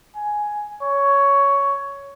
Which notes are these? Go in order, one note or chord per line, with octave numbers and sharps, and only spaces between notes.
G#5
C#5